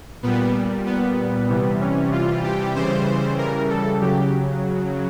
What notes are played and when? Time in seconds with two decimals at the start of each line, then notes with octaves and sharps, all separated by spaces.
0.23 A#2 G3 B3
0.86 B3
1.49 C3 E3 G3
1.80 C#4
2.12 F4
2.43 G4
2.75 C#3 E3 G3 C5
3.38 A#4
3.69 A4
4.01 C#3 F#3 G4